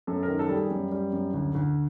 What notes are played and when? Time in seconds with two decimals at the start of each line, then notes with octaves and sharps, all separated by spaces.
0.07 F#2 A4
0.23 A#4
0.28 D#3
0.39 A4
0.49 G3 G#4
0.71 F#2
0.92 G3
1.13 F#2
1.34 D2
1.55 D2